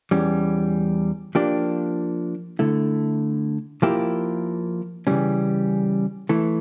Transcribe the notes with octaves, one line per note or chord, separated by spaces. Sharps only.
E2 E3 G3 C#4
F3 A#3 D4 G4
D3 A3 E4
F3 A#3 E4 G4
C#3 E3 G3 C#4
E3 A3 E4